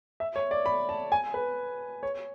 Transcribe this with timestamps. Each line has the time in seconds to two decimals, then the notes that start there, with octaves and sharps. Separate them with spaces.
0.20 E5
0.36 C#5
0.51 D5
0.66 B5
0.89 A5
1.12 G#5
1.34 B4
2.03 C#5